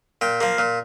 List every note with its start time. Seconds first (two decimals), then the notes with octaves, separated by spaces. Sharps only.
0.21 A#2 G5
0.41 F3 A#3
0.58 A#2